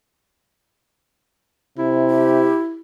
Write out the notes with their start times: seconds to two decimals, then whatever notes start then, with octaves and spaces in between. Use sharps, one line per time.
1.78 C3 E4
2.10 G4